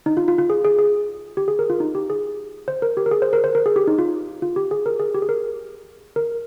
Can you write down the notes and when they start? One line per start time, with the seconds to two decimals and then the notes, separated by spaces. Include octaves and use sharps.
0.06 D#4
0.17 F4
0.28 F4
0.38 F4
0.50 G#4
0.65 G#4
0.79 G#4
1.37 G4
1.48 G#4
1.59 A#4
1.70 F4
1.80 D#4
1.95 G4
2.10 G#4
2.68 C5
2.82 A#4
2.97 G4
3.06 A#4
3.11 G#4
3.22 C5
3.33 A#4
3.44 C5
3.55 A#4
3.66 G#4
3.76 G4
3.87 D#4
3.98 F4
4.42 F4
4.56 G4
4.71 G#4
4.86 A#4
5.00 G#4
5.15 G4
5.22 G#4
5.29 A#4
6.16 A#4